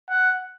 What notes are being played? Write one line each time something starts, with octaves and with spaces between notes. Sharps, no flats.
F#5